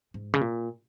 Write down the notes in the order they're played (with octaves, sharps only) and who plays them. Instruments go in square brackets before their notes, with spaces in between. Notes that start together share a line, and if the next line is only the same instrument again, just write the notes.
[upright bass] G#2
C#3
A#2